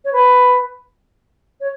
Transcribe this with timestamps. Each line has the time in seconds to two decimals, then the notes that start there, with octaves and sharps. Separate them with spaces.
0.04 C#5
0.12 B4
1.60 C#5